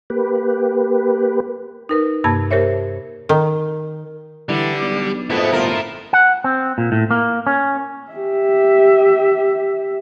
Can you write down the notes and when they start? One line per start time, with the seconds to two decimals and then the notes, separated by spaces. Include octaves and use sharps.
0.10 A#3 G4 B4
1.89 D#4 A#4 B4
2.24 G2 C3 A#3 A5 G#6
2.51 G4 A#4 C5 C#5 E5
3.29 D#3
4.49 D3 E3 G3
4.81 B1
5.30 F2 G#2 B2 A3 B3 E4
5.53 G1 F4 A#4
6.13 F#5
6.44 C4
6.78 A#2
6.92 A2
7.11 A#3
7.47 C#4
8.12 G4 E5